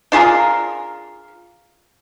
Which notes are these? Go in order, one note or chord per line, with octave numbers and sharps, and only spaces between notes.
D4 F4 G#4 A#4